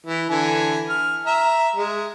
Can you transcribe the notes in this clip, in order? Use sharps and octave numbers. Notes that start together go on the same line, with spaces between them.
E3
D3 E3 G#5
F6
E5 A#5
G#3